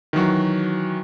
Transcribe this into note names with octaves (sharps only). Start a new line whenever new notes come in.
D#3 E3 F#3 F#4